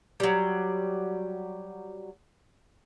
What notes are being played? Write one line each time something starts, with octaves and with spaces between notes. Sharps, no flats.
F#3 G3